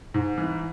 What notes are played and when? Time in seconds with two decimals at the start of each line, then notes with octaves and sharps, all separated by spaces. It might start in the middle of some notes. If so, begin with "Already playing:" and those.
0.14 G#2
0.38 E3